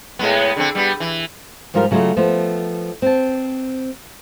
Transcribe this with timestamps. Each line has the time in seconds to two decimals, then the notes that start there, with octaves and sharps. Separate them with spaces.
0.19 A2 G#3 B3
0.57 D3 C4
0.75 G3 B3
1.00 E3
1.74 G#2 F3 G3 F4 A4 A#4
1.91 C#3 F#3 A3 C#4 F4 D#5
2.16 F3 A3 B3
3.02 C4 A5